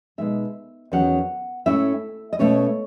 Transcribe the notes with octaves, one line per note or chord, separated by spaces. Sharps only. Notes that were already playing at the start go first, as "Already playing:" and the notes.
B2 G#3 D#4 E5
E2 D#3 F#3 C#4 F#5
A2 G#3 C#4 E4 E5
D#5
B2 A3 C#4 C#5